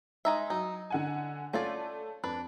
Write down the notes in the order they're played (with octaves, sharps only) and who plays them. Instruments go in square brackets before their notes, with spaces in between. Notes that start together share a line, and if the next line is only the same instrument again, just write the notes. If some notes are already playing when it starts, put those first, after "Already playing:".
[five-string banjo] G#3 D#4 E5
[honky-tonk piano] F#3 [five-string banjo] D#4
[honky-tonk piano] D3 F#5 G#5
[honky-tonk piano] A3 [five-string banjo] C#4 F4 D5
[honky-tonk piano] F2 [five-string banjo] D4 B4